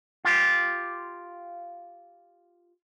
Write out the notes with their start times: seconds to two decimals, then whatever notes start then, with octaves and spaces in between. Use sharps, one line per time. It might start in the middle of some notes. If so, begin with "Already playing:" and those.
0.25 F4 G4